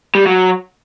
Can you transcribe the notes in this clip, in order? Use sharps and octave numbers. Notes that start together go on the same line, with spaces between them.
G3
F#3